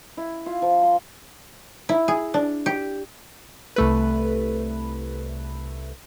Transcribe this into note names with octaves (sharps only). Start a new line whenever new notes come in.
E4
F4
F3
C6
E4
G#4
D4
G4
C2 A3 B4